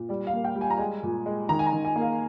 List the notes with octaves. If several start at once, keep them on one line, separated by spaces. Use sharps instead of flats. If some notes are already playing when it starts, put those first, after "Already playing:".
Already playing: A#2
G3 D5
F5
A#3
G5
G3
G#5
A#5
G#3 G#5
A#2
G#3
D#3 A#5
G#5
A#5
D#3
G#5
A#3
F5